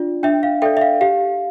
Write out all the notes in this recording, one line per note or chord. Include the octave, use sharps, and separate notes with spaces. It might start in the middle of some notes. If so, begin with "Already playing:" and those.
Already playing: D4 F4 D5
D4 E5 G5
F5
A4 D5 E5 G5
E5
F5
G4 F5